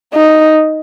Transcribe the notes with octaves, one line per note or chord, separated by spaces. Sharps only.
D#4